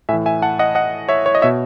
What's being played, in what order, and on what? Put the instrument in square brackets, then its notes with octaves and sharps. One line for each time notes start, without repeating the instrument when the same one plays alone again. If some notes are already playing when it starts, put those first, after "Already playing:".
[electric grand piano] A2 E5 G#5
E3
E5 G#5
F#5 A5
D#5 F#5
D#5 F#5
C#5 E5
C#5
D#5
B2 C#5 E5